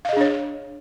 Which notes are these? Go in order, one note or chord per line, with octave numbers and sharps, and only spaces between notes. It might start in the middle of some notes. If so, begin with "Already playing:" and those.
D4 G#4 C#5 D#5 F5